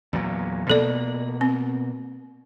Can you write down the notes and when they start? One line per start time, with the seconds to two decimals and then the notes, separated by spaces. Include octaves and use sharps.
0.13 E2 A#2 F#3
0.70 B2 A#3 A4 D5
1.41 C4